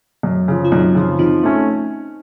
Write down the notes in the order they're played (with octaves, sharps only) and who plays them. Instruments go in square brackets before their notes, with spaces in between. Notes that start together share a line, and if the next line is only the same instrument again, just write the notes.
[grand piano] F#2
C#3 F3
[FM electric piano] F4
[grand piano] F#2 [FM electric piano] C4 D#4
[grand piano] C#3 F3
[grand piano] F3 [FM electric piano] C4 D#4
[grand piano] A3 C#4